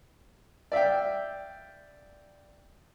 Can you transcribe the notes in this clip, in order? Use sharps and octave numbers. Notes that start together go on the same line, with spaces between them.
D5 E5 F5 G5